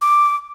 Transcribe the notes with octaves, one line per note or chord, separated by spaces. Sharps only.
D6